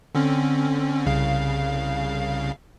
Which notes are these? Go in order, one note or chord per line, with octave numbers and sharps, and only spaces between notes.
D3 C4 C#4
C2 C#3 F5